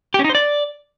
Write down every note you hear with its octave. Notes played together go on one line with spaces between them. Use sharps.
G4
C#4
D#4
C5
D5